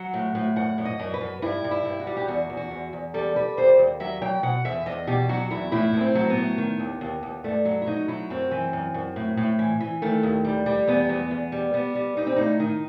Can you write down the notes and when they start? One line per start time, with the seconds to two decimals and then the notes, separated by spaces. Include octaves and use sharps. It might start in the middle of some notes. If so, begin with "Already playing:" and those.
Already playing: F#3 F#5
0.14 A2
0.35 A2
0.56 F#2 F#5
0.78 F#2
0.85 D#5
0.99 F#2
1.14 B4
1.21 F#2
1.42 G2 E4
1.64 G2
1.71 E4
1.85 G2
2.00 F#4
2.07 G3
2.17 G4
2.28 E2 F#4
2.50 E2
2.57 F#4
2.71 E2
2.93 E2
3.14 G3 A4
3.36 G3 B4
3.57 D#2 C5
3.79 D#2
4.00 F#3 E5
4.22 F#3 G5
4.43 B2 F#5
4.65 E2 E5
4.86 E2 D#5
5.07 B2 G4
5.29 F#3 F#4
5.50 E2 E4
5.72 A2 E4
5.94 A2 B3
6.01 C4
6.15 F#3
6.30 B3
6.37 A2
6.58 D#3
6.79 D#2
7.01 D#2
7.23 D#2
7.44 G2 A3
7.65 F#3
7.82 E4
7.87 F#3 D#4
8.08 F#3 E4
8.30 F#2 C4
8.51 E3
8.73 F#2
8.94 F#2
9.16 A2
9.37 A2
9.59 E3
9.80 E3
10.02 D#3 A3
10.23 D#2
10.45 G3
10.66 G3
10.87 E2 B3
11.09 E2
11.31 E2
11.52 G3
11.74 G3 B3
11.95 G3
12.17 G3 D#4
12.27 C4
12.36 A2 D#4
12.60 D#3 D#4